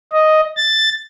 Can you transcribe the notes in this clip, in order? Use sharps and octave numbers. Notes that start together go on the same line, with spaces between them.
D#5
A6